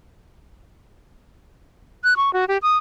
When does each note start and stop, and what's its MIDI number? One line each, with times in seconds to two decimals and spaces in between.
2.04 2.14 90
2.17 2.33 85
2.33 2.45 66
2.48 2.58 67
2.62 2.77 87